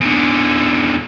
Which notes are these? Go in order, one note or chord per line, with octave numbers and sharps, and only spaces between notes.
E2 D3